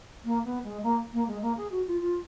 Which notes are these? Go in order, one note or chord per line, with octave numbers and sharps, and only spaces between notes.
A#3
B3
G#3
A#3
A#3
G#3
A#3
G#4
F#4
F4
F4